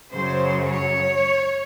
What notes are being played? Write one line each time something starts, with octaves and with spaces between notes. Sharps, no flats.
F#2 C#3 F#3 C5
C#5